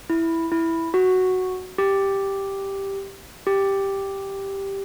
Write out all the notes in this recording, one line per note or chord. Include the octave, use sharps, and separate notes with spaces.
E4
E4
F#4
G4
G4